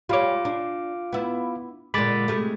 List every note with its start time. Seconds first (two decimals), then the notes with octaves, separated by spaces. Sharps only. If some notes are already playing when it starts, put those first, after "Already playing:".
0.09 G3 F4 C#5 F5 D6
0.45 D4
1.13 B3 E4
1.94 A#2 D3 G#3 B5 D6 A6
2.28 C3 G#3 A3